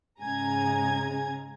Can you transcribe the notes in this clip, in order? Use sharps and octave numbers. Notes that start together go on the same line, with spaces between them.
G#2 C#3 G#3 G#5 A#5 G#6